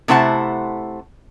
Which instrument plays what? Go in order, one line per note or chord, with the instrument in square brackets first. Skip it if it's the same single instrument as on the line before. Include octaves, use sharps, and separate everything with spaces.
[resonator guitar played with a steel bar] C3 A3 E4 C5 F#5 A5